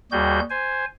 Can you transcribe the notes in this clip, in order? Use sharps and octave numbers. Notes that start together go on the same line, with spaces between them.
D#2 G3 F#4 G#4 G6
C5 G#5